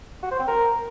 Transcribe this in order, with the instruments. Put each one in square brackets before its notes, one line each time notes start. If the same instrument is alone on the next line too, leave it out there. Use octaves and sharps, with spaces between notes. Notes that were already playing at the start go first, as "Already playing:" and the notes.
[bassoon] F#4
C5
C4
A#4